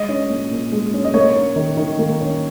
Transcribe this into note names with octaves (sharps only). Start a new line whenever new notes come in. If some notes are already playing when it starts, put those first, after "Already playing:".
Already playing: G#3 D#5
C#4
A#2
A#2
G#3
C#4
D#5
A#3 C#5
C#4
D#3
D#3
A#3
C#4